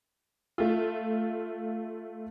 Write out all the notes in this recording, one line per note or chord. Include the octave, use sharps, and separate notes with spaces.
A3 F4